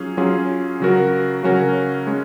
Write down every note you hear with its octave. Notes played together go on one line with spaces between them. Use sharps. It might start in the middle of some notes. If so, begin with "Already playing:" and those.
Already playing: F#3 C#4 F4 G#4
F#3 C#4 F4 G#4
C#3 F#3 C#4 F#4 A#4
C#3 F#3 C#4 F#4 A#4
G#3 C#4